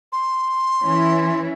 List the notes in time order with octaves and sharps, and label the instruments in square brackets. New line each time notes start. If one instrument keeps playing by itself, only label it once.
[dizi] C6
[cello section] E3 C#4 E4